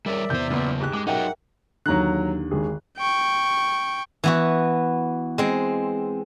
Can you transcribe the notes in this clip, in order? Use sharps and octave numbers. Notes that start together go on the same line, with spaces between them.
G3 G#4 A#4 C#5 D5 E5
E2 C3 C5 G6
F#2 A#2 C#3 A#3 B3
G#2 G4 F#6
G#3 D6
F#3 D#4 A#4 E5 F#5 G5
D#2 D3 F#3 A#5 F#6
G#1 G#4
G5 C#6
E3 B3 F#4
G#3 C4